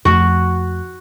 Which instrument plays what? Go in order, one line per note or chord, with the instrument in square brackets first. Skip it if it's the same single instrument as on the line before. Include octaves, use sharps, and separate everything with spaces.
[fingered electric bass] F2 F3 A3 [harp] F#4